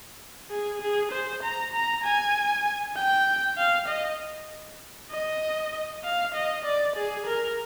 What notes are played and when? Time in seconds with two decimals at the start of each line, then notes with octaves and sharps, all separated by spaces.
0.50 G#4
0.81 G#4
1.12 C5
1.43 A#5
1.73 A#5
2.04 G#5
2.96 G5
3.58 F5
3.88 D#5
5.11 D#5
6.04 F5
6.35 D#5
6.65 D5
6.96 G#4
7.27 A#4